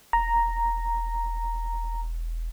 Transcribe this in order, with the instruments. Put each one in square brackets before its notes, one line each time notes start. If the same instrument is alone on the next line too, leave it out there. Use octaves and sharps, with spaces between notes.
[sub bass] E1 [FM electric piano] A#5